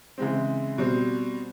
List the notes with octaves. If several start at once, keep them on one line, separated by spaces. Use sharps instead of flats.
C#3 E3 G#3 C4
B2 G3 C4